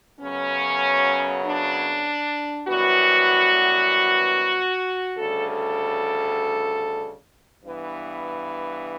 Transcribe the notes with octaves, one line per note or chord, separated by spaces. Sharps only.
F#2 C#3 F#3 B3 C#4
D4
F#2 E3 G3 B3 F#4
D2 C#3 G3 A4
A4
G2 E3 B3